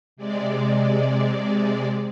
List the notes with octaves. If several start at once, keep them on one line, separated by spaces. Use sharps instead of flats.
C3 G#3 D5